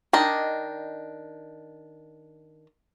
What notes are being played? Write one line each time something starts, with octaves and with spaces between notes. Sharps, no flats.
D#3 D4 D#5